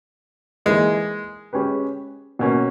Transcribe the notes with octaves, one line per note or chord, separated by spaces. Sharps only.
E3 G#3 A#3 D#4
G#3 C#4 G4 B4
B2 A#3 C#4